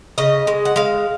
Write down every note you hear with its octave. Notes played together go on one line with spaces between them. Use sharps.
C#3 D#5
G#3
F#5
G#3 F5